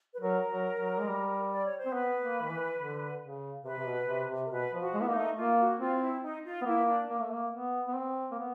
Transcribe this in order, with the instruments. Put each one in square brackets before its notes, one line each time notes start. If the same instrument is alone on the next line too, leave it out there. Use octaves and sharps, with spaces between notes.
[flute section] B4
[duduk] F#3 [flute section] A#4
[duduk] F#3
F#3
G#3
G3
[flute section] D5
C#5
C5
[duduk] C4
[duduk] B3 [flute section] B4
[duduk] A#3
D#3
E3
D3
C#3
[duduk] C3 [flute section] B4
[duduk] C3
B2
C3
C3
[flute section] A#4
[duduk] B2 [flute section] B4
[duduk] F3
[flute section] F#4
[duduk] G#3
[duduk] B3 [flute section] E4
[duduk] A#3 [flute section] D#4
[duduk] A3
[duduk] A#3 [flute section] F4
[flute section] F#4
[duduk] C4 [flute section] F4
[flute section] F4
E4
D#4
F4
[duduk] B3
[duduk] A#3 [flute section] E4
[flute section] D4
[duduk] A#3
A3
A#3
B3
B3
C4
A#3
B3